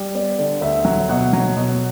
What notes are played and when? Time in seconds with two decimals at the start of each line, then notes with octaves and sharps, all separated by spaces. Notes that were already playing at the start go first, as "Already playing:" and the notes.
Already playing: G3
0.15 B3 D5
0.39 D3
0.61 D2 E5
0.85 F#3
1.09 B2 F#5
1.33 F#3
1.57 B2